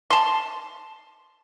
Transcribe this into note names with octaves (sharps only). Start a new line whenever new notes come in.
A5 C6